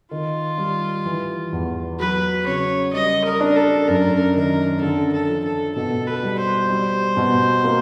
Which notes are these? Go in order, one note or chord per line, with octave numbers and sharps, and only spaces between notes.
D#3 F4
G3
E3
E2
F#3 B4
C#3 C#5
G3 D#5
A#4
D4
A4
F#2 A#4
D#3 A#4
D3 A4
A4
F3
A4
B2 A4
B4
G3
C5
G3
B2
A#3